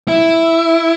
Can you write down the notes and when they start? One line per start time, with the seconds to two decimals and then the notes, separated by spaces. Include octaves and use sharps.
0.08 E4